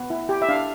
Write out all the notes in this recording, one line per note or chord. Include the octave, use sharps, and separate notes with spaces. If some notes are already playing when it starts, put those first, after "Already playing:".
Already playing: B3
E4
G4
E5
D4 F5